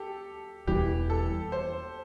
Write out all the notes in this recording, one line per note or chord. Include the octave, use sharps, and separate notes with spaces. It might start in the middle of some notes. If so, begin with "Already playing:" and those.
Already playing: G4 A4
E1 E2 E3 G3 G4
A4
C5